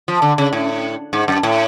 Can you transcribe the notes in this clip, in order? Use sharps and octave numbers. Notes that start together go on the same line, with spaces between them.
F3
D3
C#3
A2
G#2
F#2
A2